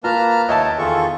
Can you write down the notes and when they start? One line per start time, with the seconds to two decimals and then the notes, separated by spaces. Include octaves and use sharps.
0.04 A#3 F4 B4 A5 A#5 F6
0.49 D#2 C#5 D#5 E5 G5 A5
0.79 E2 D#3 F4 G#4 A4 C#6